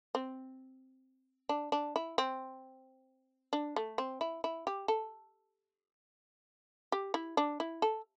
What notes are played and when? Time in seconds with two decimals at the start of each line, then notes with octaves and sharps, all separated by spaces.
0.15 C4
1.49 D4
1.72 D4
1.96 E4
2.18 C4
3.53 D4
3.76 A3
3.98 C4
4.21 E4
4.44 E4
4.67 G4
4.88 A4
6.92 G4
7.14 E4
7.37 D4
7.60 E4
7.82 A4